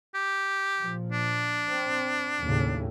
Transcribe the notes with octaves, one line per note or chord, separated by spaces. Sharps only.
G4
A#2 F3
D4
C4
D#2 A2 C#3